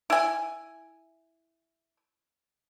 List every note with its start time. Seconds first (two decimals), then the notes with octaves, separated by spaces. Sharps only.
0.10 E4 G#5